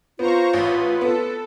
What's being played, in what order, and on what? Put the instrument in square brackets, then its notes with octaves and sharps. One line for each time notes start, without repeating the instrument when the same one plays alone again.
[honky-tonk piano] B3 [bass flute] F4 [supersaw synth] C5 A#5 C#6
[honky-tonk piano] A1 [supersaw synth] B4
[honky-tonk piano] B3 [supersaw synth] A4